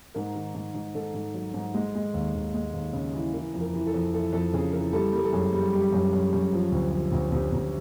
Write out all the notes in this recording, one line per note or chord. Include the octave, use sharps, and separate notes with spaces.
G#2 A#4
D#3
G#2
G#2
G#2 A4
G#2
F#3
G#2
G#3
G#3
D#2
D#2
G#3
D#2
C#3
E3
E3 A#4
F2
A#4
E3
A4
F2
E3 A4
F2 A4
C#3 G#4
E3 A#4
G3 A4
G3 A#4
A4
F#2 G#4
G3
G3 G4
F#2
F#2
F#2
F3
D2
F3
D2
D2 G4
D2